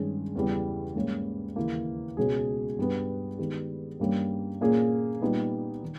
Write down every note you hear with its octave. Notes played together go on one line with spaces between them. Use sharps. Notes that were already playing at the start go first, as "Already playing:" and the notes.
Already playing: G2 D#3 G#3 C#4 G#4
E2 C#3 E3 G3 B3
G#2 G3 A#3 C#4
D#2 C#3 E3 A#3
C#2 B2 G#3 C#4 G#4
G2 G3 B3
D#3 G#3 B3 G4
G2 G3 A#3 C#4
A#2 A#3 C#4 G#4
A#2 G3 B3 D#4
D#3